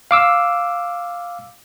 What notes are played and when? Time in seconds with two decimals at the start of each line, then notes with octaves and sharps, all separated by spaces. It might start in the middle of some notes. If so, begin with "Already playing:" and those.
0.11 F5 D6 E6